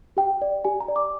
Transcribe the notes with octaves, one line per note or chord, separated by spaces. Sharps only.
G4 G5
D5
G4 G#5
A#5
D5
D6